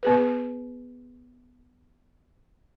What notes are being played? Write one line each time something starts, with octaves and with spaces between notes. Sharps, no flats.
B3 G#4 B4